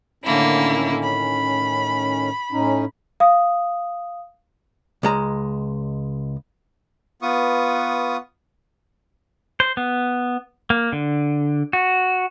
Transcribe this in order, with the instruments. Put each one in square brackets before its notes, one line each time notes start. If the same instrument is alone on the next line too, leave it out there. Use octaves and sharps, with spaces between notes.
[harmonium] A2 D#3 C#4 [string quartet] D3 A#3 E4
[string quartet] B5
[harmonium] A2 C#4 D#4
[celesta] F5 D#6
[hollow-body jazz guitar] C#2 G#3 A#5
[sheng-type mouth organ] B3 F4 B4 C#6 D#6
[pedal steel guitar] C5
B3
A#3
D3
F#4